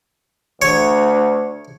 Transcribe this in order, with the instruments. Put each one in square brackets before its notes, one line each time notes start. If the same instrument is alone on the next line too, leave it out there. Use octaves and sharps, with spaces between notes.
[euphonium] D2 [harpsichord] C#5